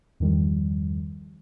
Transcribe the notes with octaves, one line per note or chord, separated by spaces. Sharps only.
E2 G2 D#3 F3 G3